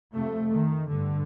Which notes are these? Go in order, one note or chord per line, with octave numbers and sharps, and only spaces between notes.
F2 C3 A3
D#3
G2 D3